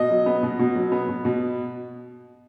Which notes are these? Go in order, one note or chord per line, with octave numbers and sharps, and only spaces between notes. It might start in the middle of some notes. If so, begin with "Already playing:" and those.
Already playing: B2 D#5
F#3
B3
B2
B2
F#3
B3
B2
B2